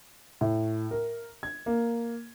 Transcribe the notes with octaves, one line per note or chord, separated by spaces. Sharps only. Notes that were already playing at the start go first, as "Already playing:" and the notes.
A2
A#4
G#6
A#3